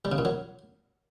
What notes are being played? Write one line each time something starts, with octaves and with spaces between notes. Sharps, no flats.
G3
C#3
A#2
F#3